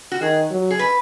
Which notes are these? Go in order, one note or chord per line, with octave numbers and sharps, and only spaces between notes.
F#4
D#3 G#4
F#3
G#4
B4